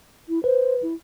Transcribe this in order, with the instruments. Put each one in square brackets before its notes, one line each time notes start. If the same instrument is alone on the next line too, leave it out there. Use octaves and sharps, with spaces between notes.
[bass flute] E4
[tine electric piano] B4 [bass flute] C5
[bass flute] E4